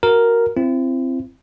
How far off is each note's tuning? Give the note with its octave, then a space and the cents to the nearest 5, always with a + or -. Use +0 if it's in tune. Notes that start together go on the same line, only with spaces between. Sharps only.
F#4 +0 A#4 +0
C4 +0 E4 +40